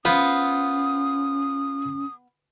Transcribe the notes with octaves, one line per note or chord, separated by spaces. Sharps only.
B3 C#4 F4 C5 F#5 D#6